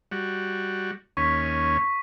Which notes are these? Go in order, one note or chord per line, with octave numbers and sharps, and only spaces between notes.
G3 F#4
D#2 C#4 C#6 B6